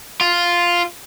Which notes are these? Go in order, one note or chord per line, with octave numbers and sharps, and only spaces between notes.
F4